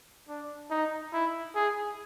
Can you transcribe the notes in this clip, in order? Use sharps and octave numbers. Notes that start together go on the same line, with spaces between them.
D4
D#4
E4
G#4